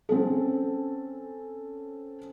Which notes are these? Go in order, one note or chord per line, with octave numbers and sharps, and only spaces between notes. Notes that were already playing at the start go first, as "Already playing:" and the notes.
C4 C#4 A4